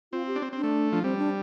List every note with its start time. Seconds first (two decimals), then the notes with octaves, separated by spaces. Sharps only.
0.12 C4 F4
0.27 G4
0.36 D4
0.42 C4
0.53 C4
0.57 D4
0.63 A3
0.92 F3 D4
1.03 G3 C4
1.18 D4